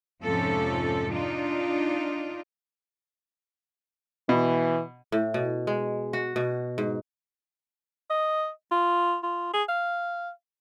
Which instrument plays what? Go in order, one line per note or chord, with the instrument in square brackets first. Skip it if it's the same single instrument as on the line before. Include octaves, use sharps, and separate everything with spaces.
[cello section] F2 G#2 C3 F3 C#4 A4
D4 D#4 F4
[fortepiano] B2 [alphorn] E3
[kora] A2
B2
G#3
F#4
B2
G#2
[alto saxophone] D#5
F4
F4
G#4
F5